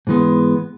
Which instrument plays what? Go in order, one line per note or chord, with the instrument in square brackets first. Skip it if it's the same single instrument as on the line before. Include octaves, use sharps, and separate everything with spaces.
[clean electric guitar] G#2 E3 G#3 B3